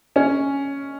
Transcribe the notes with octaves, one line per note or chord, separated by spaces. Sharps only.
C#4